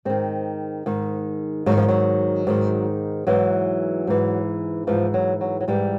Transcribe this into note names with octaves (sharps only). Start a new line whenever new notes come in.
G#2 D#3 C4
G#2 D#3
G#2 D#3 F#3
F3
F#3
G#2 D#3
G#2 E3 F#3
G#2 E3
G#2 E3 F3
F#3
F#3
F#3
G#2 E3 G3